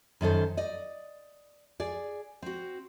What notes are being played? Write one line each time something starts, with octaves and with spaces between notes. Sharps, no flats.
F#2 D#3 A4 C5
D5 D#5
G#4 D5
C4 F#4